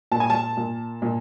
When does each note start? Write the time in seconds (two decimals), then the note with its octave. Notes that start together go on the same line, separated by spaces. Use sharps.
0.11 A#2 A5
0.20 G#5
0.30 A5
0.57 A#2
1.02 A#2